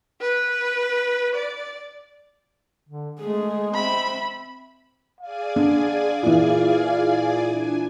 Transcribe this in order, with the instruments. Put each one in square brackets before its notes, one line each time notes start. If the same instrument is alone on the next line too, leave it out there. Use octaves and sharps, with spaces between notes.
[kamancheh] B4
D5
[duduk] D3
[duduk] G#3 [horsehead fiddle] A3 G#4
[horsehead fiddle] C4 E5 [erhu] B5
[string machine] G#4 D5 G#5 [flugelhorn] F5
[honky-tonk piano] D3
A#2 E3
[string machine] D4 G#5